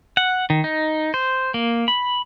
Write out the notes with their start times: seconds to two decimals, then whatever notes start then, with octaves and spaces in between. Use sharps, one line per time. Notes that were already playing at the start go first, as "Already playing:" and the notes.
0.17 F#5
0.50 D#3
0.64 D#4
1.14 C5
1.54 A#3
1.88 B5